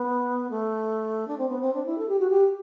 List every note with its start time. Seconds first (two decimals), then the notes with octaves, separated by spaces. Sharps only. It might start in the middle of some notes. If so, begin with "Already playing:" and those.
Already playing: B3
0.50 A3
1.27 D4
1.38 C4
1.49 B3
1.61 C4
1.73 D4
1.86 E4
1.98 A4
2.08 G4
2.19 F#4
2.30 G4